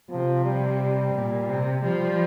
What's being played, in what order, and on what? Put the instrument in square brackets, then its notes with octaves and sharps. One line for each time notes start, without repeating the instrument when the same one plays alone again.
[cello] C3 [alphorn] F3
[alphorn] G3
[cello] A#2
C3
[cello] F3 [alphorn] G3